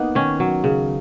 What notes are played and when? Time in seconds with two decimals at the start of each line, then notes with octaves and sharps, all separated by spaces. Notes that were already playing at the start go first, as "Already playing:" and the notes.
Already playing: A#3 B3 D#4
0.15 D#3 C#4
0.40 F#3
0.64 C#3